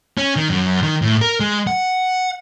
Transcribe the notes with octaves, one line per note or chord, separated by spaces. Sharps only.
C#4
D#3
F#2
D#3
A2
A#4
G#3
F#5